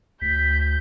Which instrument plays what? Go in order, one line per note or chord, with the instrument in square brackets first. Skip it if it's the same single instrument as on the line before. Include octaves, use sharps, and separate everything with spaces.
[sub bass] D2 [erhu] G6 [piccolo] B6